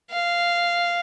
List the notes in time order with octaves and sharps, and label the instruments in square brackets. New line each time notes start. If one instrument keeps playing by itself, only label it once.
[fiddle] F5